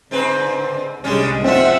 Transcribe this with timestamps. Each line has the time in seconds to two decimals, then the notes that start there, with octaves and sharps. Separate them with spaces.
0.11 G#2 D3 C4 B4
1.04 C2 D3 G3 G#3 C#4
1.44 F3 C4 F4 E5 F#5 E6